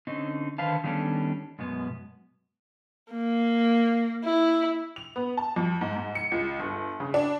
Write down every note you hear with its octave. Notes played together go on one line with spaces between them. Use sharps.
D3 C4 C#4 D#4
D3 D#3 B4 C5 F5 A5
D#3 G3 B3 C#4 D4 A4
F#2 B2 G#3 B3
A#3
E4
F7
B3
A5
F2
G#2
G#2
C#7
C#2
G1
C#3
D4